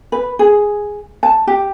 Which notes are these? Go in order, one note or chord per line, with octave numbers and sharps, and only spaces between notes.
B4
G#4
A5
G4